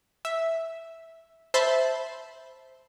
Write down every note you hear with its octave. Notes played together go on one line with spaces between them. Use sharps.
E5
C5 E5 A5 B5 C6